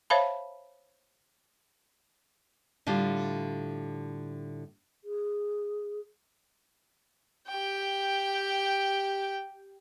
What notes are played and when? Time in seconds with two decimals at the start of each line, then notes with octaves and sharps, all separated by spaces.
0.10 C5 C#5 E5 F5 A5 B5
2.87 A2 D3 G3 F4
5.04 G#4
7.48 G4 G5